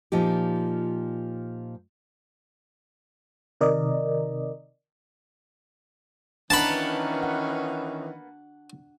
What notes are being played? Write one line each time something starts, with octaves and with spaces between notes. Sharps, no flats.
A#2 F3 D#4 G4
C3 D#3 A#4 D5 D#5
D#3 E3 A#3 B3 C#4 D4 A5 B5
F#5